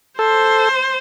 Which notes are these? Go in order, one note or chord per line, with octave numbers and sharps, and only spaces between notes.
A4 C5